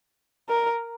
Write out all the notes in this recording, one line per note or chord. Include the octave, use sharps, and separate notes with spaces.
A#4